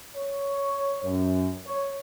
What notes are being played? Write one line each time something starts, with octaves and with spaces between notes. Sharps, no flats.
C#5
F#2
C#5